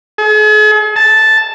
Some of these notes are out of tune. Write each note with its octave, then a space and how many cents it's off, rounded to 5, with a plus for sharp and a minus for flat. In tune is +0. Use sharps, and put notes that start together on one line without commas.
G#4 +45
A5 +0